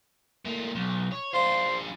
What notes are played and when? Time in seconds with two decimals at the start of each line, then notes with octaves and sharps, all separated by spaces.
0.45 A2 A#3
0.75 B1
1.12 C#5
1.34 D4 F4 C5